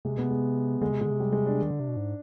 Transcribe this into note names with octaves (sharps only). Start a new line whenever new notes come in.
C3 G#3
B2 B3
C3
G#3
D3 G#3
C3
B2 D3 G#3
C3
G3
G#3
D4
D#3
D3
C3
B2
G#2